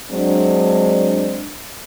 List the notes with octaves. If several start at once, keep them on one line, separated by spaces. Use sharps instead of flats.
F#3 G#3 C4 D4